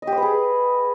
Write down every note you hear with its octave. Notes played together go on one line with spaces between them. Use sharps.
D#5
G4
C5
B4
G#4